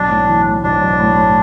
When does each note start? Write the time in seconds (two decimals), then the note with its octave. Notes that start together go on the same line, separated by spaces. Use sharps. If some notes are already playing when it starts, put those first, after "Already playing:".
Already playing: B1 D4
0.09 A2
0.27 E3
0.45 A2
0.63 B1 D4
0.81 B1
1.00 A2
1.17 A2